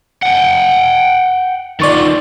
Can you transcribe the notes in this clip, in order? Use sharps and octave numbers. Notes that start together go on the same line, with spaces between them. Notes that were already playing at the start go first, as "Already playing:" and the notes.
F#5 G5
D#3 F4 D5 C#6 A6